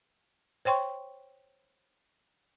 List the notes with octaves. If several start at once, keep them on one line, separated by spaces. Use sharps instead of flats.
C5 C#5 G5 C6 C#6